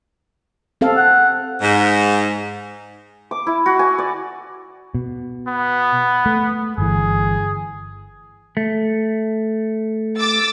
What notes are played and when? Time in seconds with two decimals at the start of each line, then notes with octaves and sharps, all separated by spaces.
0.81 C4 A4 F5
0.97 F#5
1.62 G#2
3.31 D6
3.47 E4
3.66 F#4
3.79 G#5
3.98 D5
4.95 B2
5.48 B3
6.26 A3
6.78 G1 E3 G#4
8.57 A3
10.20 D6 E6 A6